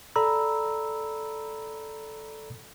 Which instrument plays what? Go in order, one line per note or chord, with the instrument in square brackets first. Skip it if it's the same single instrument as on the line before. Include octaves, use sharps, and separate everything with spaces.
[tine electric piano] A4 D5 A#5 B5 E6